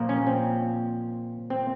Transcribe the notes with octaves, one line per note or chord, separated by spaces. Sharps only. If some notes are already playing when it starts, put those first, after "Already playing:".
Already playing: A#2 F3 A#3
C#4
C4
C4